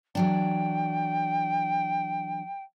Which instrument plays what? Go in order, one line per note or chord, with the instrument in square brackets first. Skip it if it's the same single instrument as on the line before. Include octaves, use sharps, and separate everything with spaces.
[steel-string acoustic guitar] E3 F#3 D4 [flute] G5